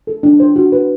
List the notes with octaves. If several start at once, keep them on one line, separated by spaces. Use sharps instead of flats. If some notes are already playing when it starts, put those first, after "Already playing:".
A4
D4
C5
F#4
B4